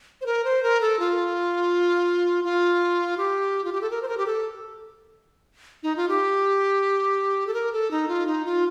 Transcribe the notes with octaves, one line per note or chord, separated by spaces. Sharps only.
C5
A#4
C5
A#4
A4
F4
F4
G4
F4
G4
A4
A#4
C5
A#4
G4
A4
D#4
F4
G4
A4
A#4
A4
D#4
F4
D#4
F4